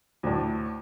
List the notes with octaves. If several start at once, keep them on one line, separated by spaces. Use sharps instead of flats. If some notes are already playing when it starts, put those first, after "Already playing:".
D2 A2